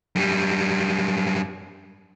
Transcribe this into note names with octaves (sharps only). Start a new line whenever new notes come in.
F#2 G3